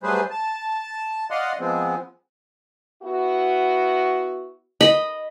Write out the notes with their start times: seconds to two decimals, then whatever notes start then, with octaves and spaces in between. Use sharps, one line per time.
0.03 F#3 G3 A3 G#4 B4 C5
0.30 A5
1.31 D5 D#5 F5 F#5 C6
1.59 F3 G#3 B3 C4
3.02 B3 E4 F#4
4.81 D#5 B5